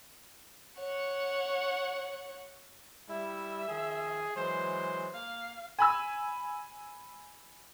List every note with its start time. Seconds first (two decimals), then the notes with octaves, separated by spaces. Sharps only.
0.79 C#5 F#5
3.09 G3 E4 E5
3.68 D#3 F3 G#4
4.36 E3 F#3 G#3 C5
5.14 A#3 F5
5.79 G#5 B5 E6